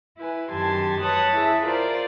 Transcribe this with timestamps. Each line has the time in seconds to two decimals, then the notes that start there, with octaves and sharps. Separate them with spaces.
0.17 E4 B4 G#5
0.51 F#2 D#3 G4 A5 C6 G#6
1.00 B4 C#5 A5 D#6 F#6
1.32 E4 G#4 E5 A5
1.64 F4 A#4 C5 D5